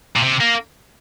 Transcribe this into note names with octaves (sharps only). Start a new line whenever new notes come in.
A#2
C3
A#3